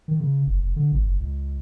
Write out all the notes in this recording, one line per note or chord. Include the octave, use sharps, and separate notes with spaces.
D#3
C#3
F#1
F1
D3
G#1
F#1
C#2